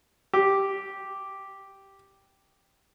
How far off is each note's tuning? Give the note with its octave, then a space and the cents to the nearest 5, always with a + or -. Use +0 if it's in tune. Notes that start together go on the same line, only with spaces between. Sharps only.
G4 -5